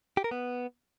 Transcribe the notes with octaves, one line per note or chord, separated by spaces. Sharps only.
G4
A#4
B3